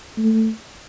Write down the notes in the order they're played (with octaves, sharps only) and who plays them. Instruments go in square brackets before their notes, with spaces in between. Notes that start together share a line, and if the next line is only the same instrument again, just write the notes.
[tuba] A3